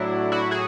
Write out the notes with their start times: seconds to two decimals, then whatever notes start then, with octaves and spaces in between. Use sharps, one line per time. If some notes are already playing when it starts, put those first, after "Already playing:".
Already playing: A2 F#3 D4 E4
0.32 E4 F#4
0.51 F#4 G#4